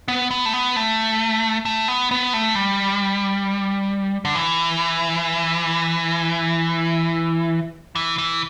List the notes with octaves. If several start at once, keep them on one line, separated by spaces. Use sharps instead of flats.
B3
B3
A3
B3
A3
A3
B3
B3
A3
G3
D3
E3
E3
E3